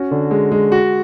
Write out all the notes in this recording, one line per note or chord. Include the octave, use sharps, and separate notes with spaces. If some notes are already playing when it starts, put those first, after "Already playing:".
Already playing: C#4 F#4
D3
G#3
G#3
F#4